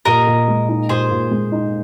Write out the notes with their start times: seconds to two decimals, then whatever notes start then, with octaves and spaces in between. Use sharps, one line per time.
0.05 A#2 A#4 D#5
0.27 A#2
0.48 G#3
0.69 D#4
0.89 A#2 G#4 C5
1.10 A#2
1.31 G#3
1.52 D#4